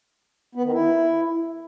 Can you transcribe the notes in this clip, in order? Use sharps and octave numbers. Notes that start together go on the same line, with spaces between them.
B3
D#3
E4